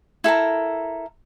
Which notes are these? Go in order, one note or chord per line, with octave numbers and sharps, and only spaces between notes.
E4 A4 A#4 A#5